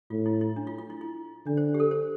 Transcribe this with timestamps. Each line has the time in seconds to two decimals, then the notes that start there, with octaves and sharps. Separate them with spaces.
0.10 A2 F4
0.26 E4
0.41 E4
0.56 D4
0.67 F4
0.79 F4
0.90 E4
1.01 E4
1.47 D3 D4
1.57 C5
1.74 G4
1.80 A4
1.91 C5